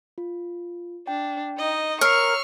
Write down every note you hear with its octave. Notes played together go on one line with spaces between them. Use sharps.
F4
D4 G5
D#4 D#5
A#4 C#5 C#6 E6 F6 C7